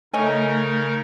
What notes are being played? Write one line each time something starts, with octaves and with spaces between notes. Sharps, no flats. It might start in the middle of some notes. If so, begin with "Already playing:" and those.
C#3 A3 D#4 A#4 C#5 D#5 G#5